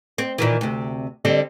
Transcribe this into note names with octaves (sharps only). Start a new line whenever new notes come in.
C4
A#2 D#3 E3
D2 C3
D3 G3 C4